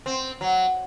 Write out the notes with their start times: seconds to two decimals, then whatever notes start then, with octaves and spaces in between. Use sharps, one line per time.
0.06 C4
0.41 F#3